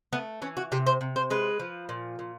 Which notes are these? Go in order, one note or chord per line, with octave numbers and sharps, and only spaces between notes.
A3 B3
E3 C#4
F#4
C3 G4
C5
C3
C5
G#3 B4
F3
A#2
A#2